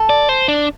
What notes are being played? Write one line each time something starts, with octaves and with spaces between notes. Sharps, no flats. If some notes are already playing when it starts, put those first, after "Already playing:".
Already playing: A4
D5
C5
D4